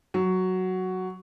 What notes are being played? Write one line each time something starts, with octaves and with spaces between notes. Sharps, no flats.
F#3